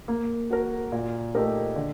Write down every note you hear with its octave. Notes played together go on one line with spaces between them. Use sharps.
A#3
F#4 A#4
A#2
A3 D#4 G4 A#4
D3